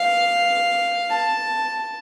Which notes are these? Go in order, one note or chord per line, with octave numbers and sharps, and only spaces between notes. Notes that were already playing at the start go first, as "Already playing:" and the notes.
Already playing: F5
A5